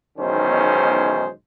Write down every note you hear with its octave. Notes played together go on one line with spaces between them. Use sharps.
B1 E2 D#3 G#3 C#4 C5